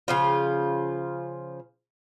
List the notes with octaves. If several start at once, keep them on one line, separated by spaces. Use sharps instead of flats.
C#3 F3 F4